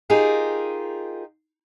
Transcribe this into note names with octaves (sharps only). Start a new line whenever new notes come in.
D#4 F4 G4 G#4 A#4